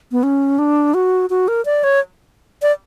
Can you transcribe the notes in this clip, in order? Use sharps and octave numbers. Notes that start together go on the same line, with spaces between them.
B3
C#4
D4
F#4
F#4
A#4
D5
C#5
D5